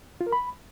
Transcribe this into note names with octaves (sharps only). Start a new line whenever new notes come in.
F4
A#4
B5